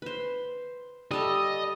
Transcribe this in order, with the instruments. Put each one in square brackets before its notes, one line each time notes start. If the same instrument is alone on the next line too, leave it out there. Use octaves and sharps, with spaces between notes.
[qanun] B4 C5
[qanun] G3 A4 E5 [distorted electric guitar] D#5